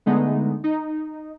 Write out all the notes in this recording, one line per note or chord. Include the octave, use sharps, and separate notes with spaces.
D3 G#3 A3 B3 D#4
D#4